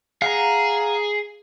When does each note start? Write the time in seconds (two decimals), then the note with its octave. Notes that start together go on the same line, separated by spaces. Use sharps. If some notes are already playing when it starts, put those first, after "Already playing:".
0.22 G#4 F5 F#5 A#5